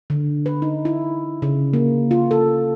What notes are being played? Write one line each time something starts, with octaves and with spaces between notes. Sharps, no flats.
D3
B4
D#4
E4
C#3
A#3
F4
A4